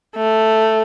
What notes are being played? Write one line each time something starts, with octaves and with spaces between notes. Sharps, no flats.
A3